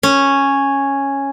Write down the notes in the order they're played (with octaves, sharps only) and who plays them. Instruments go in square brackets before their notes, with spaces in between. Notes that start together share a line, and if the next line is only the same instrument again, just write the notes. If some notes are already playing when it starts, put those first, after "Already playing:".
[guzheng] C#4